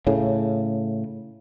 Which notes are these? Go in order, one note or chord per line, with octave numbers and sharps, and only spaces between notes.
A2 C#3